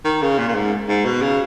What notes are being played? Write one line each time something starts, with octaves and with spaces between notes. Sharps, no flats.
D#3
C#3
A#2
A#2
G#2
G#2
B2
C#3